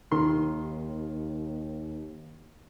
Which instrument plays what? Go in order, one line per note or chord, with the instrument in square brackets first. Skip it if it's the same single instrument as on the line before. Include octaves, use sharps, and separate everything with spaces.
[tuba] D#2 [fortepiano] D#3 C6